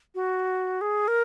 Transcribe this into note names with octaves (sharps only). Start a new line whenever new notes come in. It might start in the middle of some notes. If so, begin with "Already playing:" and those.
F#4
G#4
A#4